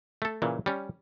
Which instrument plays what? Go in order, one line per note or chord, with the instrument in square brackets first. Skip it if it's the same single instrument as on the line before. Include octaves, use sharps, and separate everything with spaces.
[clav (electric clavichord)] A3 A4
A#2 C#3 E3
G3 C#4